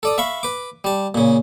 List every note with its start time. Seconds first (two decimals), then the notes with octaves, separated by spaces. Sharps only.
0.03 A4 D5 D#6
0.18 E5 F5 B5 C#6
0.43 B4 D6
0.84 G3 A5
1.15 A#2 C#3